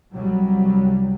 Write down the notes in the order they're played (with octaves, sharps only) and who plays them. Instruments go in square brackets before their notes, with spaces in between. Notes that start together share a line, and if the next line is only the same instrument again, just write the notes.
[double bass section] C2 F#3 G3